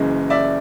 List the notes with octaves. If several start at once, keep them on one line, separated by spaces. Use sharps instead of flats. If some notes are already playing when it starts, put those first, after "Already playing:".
Already playing: F#1 F#2 C#3 E3 G#3 D#5
D5 E5